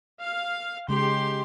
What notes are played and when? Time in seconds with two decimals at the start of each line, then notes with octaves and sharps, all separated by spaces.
0.20 F5
0.89 C#3 G#3 G4 C6